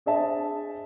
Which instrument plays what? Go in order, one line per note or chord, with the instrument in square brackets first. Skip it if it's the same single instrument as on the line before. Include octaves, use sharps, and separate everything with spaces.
[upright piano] D4 G#4 C5 D#5 E5 A5